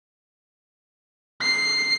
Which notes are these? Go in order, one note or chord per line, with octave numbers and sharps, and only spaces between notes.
C7